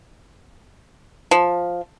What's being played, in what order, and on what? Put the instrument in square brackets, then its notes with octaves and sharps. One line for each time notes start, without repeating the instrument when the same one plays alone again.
[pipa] F3